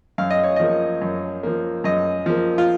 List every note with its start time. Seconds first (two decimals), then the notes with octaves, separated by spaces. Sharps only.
0.18 F#2 F5
0.30 D#5
0.44 C#5
0.56 F3 A#3 D#5
1.02 F#2
1.43 F3 A#3
1.84 F#2 D#5
2.26 F3 A#3
2.58 F4